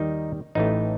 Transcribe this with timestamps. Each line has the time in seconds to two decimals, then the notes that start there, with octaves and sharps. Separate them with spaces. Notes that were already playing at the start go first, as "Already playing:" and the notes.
Already playing: D#2 D#3 G3 D#4
0.55 A1 A2 E3 A3 D#4